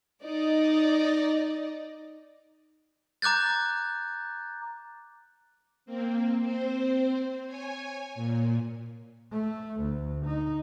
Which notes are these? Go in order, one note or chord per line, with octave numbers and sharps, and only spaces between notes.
D#4 D5 D#5
A#5 D6 F#6 G6 A6
A#3 C4
C4 C5
C#5 G#5
A#2
A3
D2
D#4